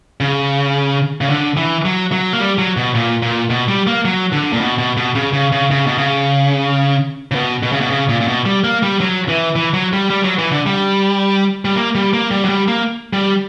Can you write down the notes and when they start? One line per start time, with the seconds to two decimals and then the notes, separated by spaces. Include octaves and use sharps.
0.20 C#3
1.21 C#3
1.29 D3
1.57 E3
1.85 F#3
2.12 F#3
2.33 A#3
2.40 G3
2.58 F#3
2.77 B2
2.95 A#2
3.23 A#2
3.50 B2
3.68 G3
3.87 A#3
4.05 F#3
4.32 D3
4.53 A#2
4.61 B2
4.78 B2
4.97 B2
5.15 C#3
5.33 C#3
5.52 C#3
5.71 C#3
5.87 B2
5.98 C#3
7.31 C#3
7.35 B2
7.63 B2
7.72 C#3
7.81 B2
7.90 C#3
8.09 A#2
8.21 A#2
8.28 B2
8.46 G3
8.64 A#3
8.83 G3
9.00 F#3
9.29 E3
9.56 E3
9.74 F#3
9.93 G3
10.10 G3
10.24 F#3
10.38 E3
10.52 D3
10.66 G3
11.65 G3
11.76 A#3
11.95 G3
12.13 A#3
12.31 G3
12.44 F#3
12.49 G3
12.68 A#3
13.13 G3